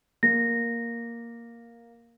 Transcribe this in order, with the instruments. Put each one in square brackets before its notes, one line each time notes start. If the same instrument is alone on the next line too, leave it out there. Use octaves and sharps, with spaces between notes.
[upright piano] A#3 [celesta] A#6